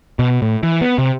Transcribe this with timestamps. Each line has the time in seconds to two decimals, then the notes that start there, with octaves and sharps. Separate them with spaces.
0.19 B2
0.42 A2
0.63 E3
0.81 B3
0.98 C3